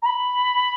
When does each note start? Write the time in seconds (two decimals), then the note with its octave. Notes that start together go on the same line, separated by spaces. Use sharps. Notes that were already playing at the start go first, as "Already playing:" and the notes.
0.02 A#5
0.06 B5